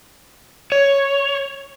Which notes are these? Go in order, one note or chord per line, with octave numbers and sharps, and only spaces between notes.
C#5